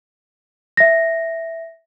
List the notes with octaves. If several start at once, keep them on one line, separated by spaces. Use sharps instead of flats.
E5 A#6